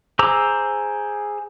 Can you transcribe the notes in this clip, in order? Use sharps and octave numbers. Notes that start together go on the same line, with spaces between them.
G#4 C5 A#5 D6 E6